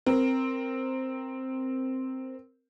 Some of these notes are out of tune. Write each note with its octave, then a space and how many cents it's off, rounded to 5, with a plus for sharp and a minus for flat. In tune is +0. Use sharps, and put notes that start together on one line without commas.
C4 +0 A#4 +0